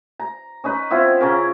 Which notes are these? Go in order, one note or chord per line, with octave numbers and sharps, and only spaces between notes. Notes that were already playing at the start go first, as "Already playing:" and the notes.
A#5
C#4 D#4 B4
B3 C4 E4 F4
C#3 C#4 A#4